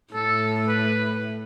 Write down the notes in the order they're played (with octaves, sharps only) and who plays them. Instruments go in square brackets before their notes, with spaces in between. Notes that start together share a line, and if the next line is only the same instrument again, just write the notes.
[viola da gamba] A2 [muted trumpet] A4
[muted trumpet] B4